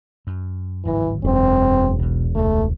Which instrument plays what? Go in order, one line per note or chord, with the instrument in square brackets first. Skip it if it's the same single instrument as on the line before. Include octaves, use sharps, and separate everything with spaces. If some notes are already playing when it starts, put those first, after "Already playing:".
[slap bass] F#2
[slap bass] D1 G#1 F#3 [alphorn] E3
[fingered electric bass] E1 [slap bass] F#2 [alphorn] C4
[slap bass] B1 B2
[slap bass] C#2 A#2 E3 [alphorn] A3